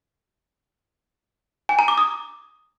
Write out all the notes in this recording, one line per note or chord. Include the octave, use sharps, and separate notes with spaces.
G#5
A#5
D6
D#6